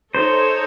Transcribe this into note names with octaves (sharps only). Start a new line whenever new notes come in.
D#4 A4 C5 C#5